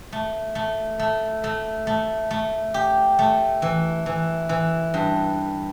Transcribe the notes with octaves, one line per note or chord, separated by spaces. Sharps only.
A3
A3
A3
A3
A3
A3
G4
A3
E3
E3
E3
G2